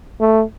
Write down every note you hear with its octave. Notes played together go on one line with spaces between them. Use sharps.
A3